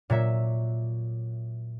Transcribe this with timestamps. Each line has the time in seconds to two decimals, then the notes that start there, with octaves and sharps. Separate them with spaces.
0.10 A#2 F#3 E5